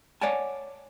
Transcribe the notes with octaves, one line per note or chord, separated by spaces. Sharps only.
C#5 D5 F#5 G#5 A5